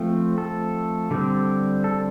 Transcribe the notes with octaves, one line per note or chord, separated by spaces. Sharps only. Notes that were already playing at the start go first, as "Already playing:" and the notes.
Already playing: F3 A3 C4
A4
D3 G3 C4
A4